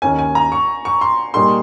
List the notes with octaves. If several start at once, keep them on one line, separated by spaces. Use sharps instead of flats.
D#2 D#3 A#3 C#4 G#5
G#5
A#5
C#6
C#6
C6
A#2 G3 A#3 D#4 G#4 C6